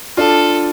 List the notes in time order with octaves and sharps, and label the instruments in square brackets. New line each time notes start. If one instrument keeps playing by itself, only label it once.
[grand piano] D4 F4 [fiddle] A4